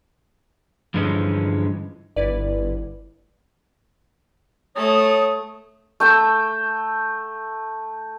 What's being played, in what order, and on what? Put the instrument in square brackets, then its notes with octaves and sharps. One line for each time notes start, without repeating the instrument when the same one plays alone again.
[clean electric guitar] G2 D3 E3 F3 G#3 C#4
[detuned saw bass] G1 [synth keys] E4 B4 D5
[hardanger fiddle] A3 [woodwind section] C#5 D#6
[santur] A3 G5 E6